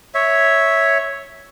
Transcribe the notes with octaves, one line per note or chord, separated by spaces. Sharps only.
C#5 E5